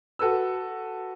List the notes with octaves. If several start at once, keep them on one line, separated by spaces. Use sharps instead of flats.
F#4 A4 B4 E6